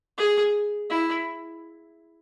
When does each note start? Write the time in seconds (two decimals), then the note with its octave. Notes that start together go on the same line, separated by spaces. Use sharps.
0.18 G#4
0.90 E4